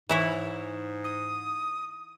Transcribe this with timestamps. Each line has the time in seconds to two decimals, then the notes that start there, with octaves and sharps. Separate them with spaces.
0.09 G#2 E3 E4 C#5
1.04 D#6